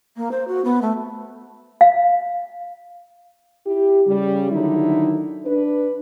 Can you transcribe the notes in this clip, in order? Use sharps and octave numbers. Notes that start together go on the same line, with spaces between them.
A#3
C5
F#4
B3
A3
F5
E4 G4
C#3 G3
D3 D#3 F#3 D#4 E4
D4 B4